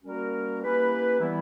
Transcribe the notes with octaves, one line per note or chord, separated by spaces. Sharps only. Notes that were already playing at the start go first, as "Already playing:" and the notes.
G3 A#3 C#4 F#4 A#4
A#3 C#4 E4 G4 B4
E3 G3 B3 E4